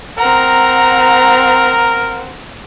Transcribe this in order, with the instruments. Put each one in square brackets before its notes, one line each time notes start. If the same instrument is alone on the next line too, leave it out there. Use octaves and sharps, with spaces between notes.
[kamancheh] C4 F#5 [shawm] A#4 [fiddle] A#5